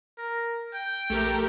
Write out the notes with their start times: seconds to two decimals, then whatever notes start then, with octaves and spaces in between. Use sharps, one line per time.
0.18 A#4
0.74 G5
1.10 A#1 A3 G4 A#4